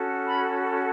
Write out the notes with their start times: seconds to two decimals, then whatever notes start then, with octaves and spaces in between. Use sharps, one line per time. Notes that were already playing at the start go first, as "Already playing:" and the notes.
Already playing: C#4 F#4 A4
0.26 B5